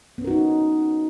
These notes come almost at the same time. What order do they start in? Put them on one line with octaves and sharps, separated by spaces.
B3 C#4 A#4 F#4 D#4